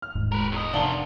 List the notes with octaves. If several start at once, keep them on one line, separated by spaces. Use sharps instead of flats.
F6
D#1 G#2
G#3 A#4 B4
E2 D#5
F1 D4 A#4 D5 F5 F#5 A5 G7